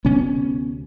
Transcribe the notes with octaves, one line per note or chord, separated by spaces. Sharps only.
D2 C3 B3 C#4